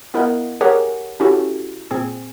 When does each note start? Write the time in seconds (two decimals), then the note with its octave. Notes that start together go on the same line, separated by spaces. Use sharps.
0.14 B3 E4 A#4 D#5 F5 F#5
0.61 G4 G#4 A#4 C#5 F#5 G#5
1.20 C#4 E4 F#4 G4 A4
1.91 A#2 C4 G#4 G#5